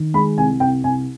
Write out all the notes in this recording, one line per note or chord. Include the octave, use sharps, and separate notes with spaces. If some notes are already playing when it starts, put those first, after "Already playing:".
Already playing: D#3
G#3 B5
C2 G#5
C2 G5
C2 G#5